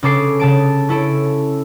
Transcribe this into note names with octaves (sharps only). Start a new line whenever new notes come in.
C#3 C#4 A4 D6 C7
C#3 A5 D7
C#4 E4 A4 D7